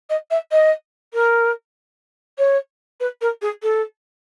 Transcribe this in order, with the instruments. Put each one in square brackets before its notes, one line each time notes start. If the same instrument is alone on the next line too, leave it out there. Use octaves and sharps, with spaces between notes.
[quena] D#5
E5
D#5
A#4
C#5
B4
A#4
G#4
A4